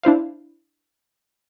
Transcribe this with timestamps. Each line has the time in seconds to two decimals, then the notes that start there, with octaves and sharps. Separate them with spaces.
0.03 D4 E4 C5 F5